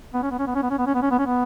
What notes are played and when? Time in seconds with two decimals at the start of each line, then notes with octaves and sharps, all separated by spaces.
0.14 B3
0.23 C#4
0.31 B3
0.39 C#4
0.47 B3
0.55 C#4
0.63 B3
0.70 C#4
0.78 B3
0.87 C#4
0.95 B3
1.02 C#4
1.11 B3
1.19 C#4
1.27 B3